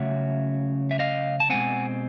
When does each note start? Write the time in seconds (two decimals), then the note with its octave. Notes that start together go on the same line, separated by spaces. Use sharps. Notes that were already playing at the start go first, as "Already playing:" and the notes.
Already playing: C#3 F#3 A3 C#4 E5 F#5
0.91 E5
0.99 D#5 F5
1.40 A5
1.50 B2 G#3 C4 F#5 G#5